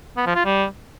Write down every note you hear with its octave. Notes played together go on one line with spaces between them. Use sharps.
B3
F3
F4
G3